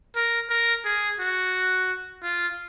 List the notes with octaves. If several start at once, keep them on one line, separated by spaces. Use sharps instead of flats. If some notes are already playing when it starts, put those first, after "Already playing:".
A#4
A#4
G#4
F#4
F4